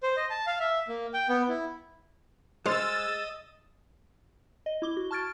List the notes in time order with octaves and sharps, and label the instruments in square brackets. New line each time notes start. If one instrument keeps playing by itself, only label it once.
[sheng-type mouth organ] C5
D#5
A5
F5
E5
A#3
G5
B3
E4
[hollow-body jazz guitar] G#3 [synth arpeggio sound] C5 F6 [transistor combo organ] D#5 [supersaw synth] E6 A6
[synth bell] D#5
E4 D6 G7
F#4
A5 C#6 F6 G#6 A6 D7